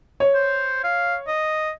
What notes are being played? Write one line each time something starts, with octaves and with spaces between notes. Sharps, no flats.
C#5
C5
F5
D#5